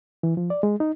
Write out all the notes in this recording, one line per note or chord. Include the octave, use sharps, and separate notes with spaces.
E3
F3
D5
G#3
D#4